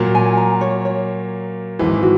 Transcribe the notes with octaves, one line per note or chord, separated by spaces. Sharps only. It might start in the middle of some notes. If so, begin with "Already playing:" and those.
Already playing: A#2 F#3 A#3
G#5
A#5
C#5
C#5
G#1 G#2 E3 G#4
F#4